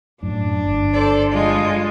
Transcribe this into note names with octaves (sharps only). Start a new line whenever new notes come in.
F#2 A2 D4
G1
A4 C5 D5
G3 G#3 F4